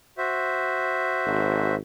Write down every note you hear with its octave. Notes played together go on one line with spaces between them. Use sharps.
F#4 C5 E5
G#1